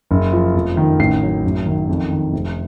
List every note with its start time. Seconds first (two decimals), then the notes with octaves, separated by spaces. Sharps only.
0.11 F#1
0.32 F3
0.55 F1
0.77 D#3
0.99 A1 C7
1.22 F#3
1.44 F#1
1.66 D#3
1.89 F2
2.11 D#3
2.33 F1